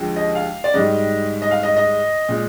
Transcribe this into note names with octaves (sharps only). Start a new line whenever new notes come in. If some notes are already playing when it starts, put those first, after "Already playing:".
Already playing: D#2 D3 F3 G#3
D#5
F5
D5
G#2 D#3 G3 D#5
D#5
F5
D#5
D#5
A#2 G#3